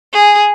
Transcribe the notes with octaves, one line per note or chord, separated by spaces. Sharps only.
G#4